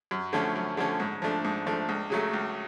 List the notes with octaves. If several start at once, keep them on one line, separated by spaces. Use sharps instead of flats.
F#2
D3 F3 A3 C#4
F#2
D3 F3 A3 C#4
G#2
F3 A3 D4
G#2
F3 A3 D4
C#2
C#3 F#3 A3
C#2